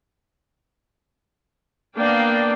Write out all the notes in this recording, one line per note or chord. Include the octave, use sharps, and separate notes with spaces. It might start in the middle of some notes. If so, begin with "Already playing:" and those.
A#3 B3 D4 D5 F5 G5